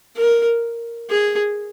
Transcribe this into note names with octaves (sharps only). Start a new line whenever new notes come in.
A#4
G#4